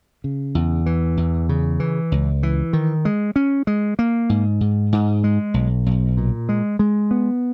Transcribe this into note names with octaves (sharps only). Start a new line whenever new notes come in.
C#3
E2
E3
E2
C#3
E3
C#2
E3
D#3
G#3
C#4
G#3
A#3
G#2
G#2
G#2
G#3
B1
B1
A#2
G#3
G#3
B3